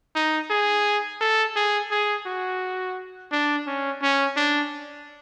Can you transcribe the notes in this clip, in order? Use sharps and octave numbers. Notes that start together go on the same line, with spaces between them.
D#4
G#4
A4
G#4
G#4
F#4
D4
C#4
C#4
D4